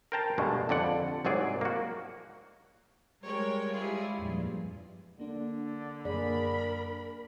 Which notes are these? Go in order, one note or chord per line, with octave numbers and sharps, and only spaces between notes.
A#4 C5 G5 A5 A#5
G2 B2 G#3 A3
F2 D3 D5 F#5
C2 G#2 F#3 G#4 D5
A#3 F#4
G3 G#3 A#4 C#5 G5
G3 G#3 E4 F4 G#4
E2 G2 A#2 F3
D3 A#3 D4
F#2 A#3 D4 G#4 A#4 D5 B5